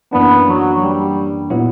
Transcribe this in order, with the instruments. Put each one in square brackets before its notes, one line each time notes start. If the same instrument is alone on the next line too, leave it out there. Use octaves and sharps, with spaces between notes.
[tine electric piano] F#2 E3 A#3 D4 [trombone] B3
[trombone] F#3
G3
[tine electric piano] A#2 F#3 B3 E4